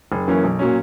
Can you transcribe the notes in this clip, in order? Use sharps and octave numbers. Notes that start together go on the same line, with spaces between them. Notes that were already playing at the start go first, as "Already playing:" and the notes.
F#1
F#2 E3 A#3 C#4
B1
A#2 F#3 C#4